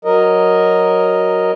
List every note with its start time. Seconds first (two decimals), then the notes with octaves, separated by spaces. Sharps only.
0.05 F#3 A#4 D#5